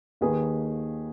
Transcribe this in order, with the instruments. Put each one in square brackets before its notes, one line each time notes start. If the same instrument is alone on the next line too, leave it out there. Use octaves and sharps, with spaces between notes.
[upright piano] D#2 D#3 A#3 G#4 B4